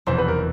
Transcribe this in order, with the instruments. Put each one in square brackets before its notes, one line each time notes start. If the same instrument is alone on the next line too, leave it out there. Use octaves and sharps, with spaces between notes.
[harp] F1 E2 B2 [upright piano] C5
[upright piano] B4
A#4